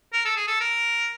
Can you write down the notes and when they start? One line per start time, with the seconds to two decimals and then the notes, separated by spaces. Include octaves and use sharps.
0.13 A#4
0.25 A4
0.36 G#4
0.48 A4
0.61 A#4